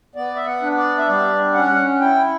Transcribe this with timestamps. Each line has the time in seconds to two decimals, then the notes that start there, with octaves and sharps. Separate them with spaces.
0.15 B3 D5
0.36 E5
0.46 F#5
0.62 D4
0.77 D5
0.98 E5
1.08 G3 D5
1.54 C#4 F#5
2.00 E4 G5